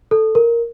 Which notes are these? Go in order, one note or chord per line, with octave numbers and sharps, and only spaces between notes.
A4
A#4